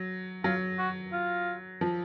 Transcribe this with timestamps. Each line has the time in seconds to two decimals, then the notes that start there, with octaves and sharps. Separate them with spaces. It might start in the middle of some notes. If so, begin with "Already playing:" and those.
Already playing: F#3
0.44 F#3 F4
0.78 F#4
1.13 F4
1.81 F3